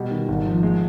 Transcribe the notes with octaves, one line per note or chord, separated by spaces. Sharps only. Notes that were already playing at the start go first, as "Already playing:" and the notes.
Already playing: B2 G3
D#3
G#1
F3
G#3